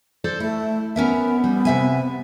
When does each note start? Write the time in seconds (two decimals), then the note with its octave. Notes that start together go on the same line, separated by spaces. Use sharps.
0.24 A4 C5 D5
0.40 A3 E4
0.96 B3 C#4 A#4 E5
1.44 G3
1.65 C3 E5 G#5